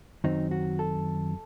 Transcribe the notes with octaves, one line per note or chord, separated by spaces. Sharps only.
F#2 D#3 F#3 C4 D#4
F#4
A4